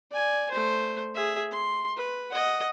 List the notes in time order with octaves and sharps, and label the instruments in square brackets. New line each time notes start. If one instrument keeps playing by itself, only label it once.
[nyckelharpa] D5 G#5
A3 C5
G#4 E5
C6
B4
D#5 F#5